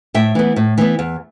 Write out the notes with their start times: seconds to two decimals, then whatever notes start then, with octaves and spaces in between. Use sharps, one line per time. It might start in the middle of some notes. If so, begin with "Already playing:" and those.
0.14 A2 E5 G5
0.35 E3 B3
0.56 A2
0.78 E3 B3
0.99 E2